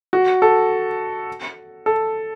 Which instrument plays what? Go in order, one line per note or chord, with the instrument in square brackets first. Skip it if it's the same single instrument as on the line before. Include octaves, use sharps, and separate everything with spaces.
[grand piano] F#4
A4
A4